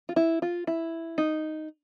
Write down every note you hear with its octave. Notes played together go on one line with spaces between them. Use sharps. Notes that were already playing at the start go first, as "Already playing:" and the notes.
F4
E4
F4
E4
D#4